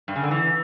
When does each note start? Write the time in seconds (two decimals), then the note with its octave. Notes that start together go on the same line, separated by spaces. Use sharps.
0.08 G2
0.16 C#3
0.23 D3
0.31 E3